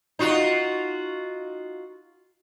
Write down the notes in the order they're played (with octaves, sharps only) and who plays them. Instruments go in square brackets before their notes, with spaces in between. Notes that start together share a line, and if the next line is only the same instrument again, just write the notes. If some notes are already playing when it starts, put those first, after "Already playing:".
[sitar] D#4 F4 F#4